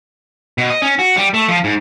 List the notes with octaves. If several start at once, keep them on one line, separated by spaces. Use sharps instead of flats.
B2
D#5
C#4
F#4
G3
A3
F3
G#2